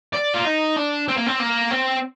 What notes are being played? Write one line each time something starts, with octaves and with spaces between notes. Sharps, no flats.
D5
F4
D#4
D4
C4
A#3
C4
A#3
C4